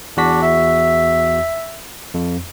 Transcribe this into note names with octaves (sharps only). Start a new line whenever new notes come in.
E2 D4 F#4 B6
E5
F2